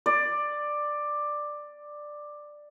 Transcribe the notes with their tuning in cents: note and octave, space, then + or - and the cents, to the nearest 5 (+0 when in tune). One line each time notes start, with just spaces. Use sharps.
D5 +10